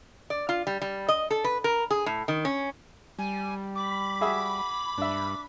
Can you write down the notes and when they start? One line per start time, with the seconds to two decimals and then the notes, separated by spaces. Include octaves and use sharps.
0.30 D5
0.49 F4
0.67 G3
0.82 G3
1.08 D#5
1.30 A4
1.44 B4
1.64 A#4
1.91 G#4
2.06 A2
2.28 D#3
2.45 C#4
3.19 G3 G#5
3.75 B5 D6
4.21 F#4 G#4 E5
4.98 G2 D4 E5